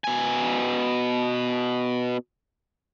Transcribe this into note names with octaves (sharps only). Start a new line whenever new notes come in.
B2 G#5